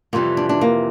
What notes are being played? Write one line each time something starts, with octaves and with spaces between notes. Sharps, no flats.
F2 C3 E3 G3 A#3
D4
D4
A#3